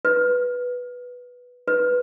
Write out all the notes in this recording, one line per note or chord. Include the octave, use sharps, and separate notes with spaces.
B4
B4